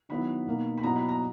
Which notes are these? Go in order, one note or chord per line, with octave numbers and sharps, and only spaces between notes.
D#3 F#3 B3 E4 B5
B2 A#3 D#4
B5
B2 F#3 B3 E4 A#5
B5
A#5